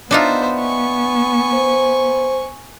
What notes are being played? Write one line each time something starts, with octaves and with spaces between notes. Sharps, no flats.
B3 D4 D#4 F4 C5 E5
G#5 C#6
C5